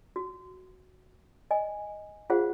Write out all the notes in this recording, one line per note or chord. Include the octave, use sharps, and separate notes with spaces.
F#4
D#5 G#5
F4 G#4 C5 F5 F#5